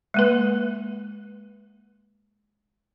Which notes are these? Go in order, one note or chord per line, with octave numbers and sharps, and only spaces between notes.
G#3 A#3 B4